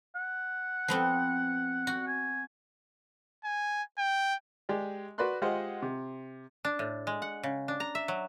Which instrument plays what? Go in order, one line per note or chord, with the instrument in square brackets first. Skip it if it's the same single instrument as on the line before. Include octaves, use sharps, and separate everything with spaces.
[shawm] F#5
[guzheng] F3 B3 C4
F#4
[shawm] G#5
[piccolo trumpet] G#5
G5
[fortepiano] G#3 G4 D5
F#4 B4 D5 B5 C6 F#6
G#3 F4 G4 C5 D#5 F#5
C3
[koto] D4
A2
G#3
F#5
C#3
D4
A#5
E5
F#3